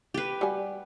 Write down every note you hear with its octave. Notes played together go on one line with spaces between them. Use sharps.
G4 B4
G3 F#4 G#5